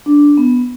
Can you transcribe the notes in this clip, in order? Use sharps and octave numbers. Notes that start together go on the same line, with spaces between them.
D4
B3